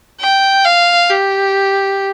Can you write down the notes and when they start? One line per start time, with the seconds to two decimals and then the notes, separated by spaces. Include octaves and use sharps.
0.20 G5
0.64 F5
1.10 G4